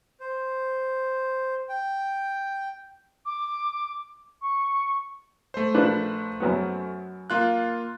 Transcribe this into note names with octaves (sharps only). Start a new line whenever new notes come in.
C5
G5
D6
C#6
A3 C5
A#1 D4 B4
F#2 F#3 B3
A#3 F4 F#6